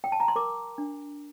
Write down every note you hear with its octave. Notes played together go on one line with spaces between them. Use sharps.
G5
A5
A#5
C6
A#4 D6
D4